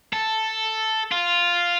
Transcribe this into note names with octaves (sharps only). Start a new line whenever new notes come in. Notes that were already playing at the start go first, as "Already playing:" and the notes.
A4
F4